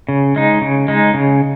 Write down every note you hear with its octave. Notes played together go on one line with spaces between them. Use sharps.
C#3
G#3 D#4
C#3
G#3 D#4
C#3